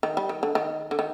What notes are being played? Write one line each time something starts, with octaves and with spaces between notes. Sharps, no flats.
D#3
G3
D#3
D3
D#3
D3
D#3